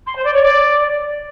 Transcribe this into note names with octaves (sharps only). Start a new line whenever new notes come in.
C6
C5
D5
C#5
D5